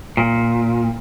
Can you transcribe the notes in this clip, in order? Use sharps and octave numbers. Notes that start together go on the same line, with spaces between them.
A#2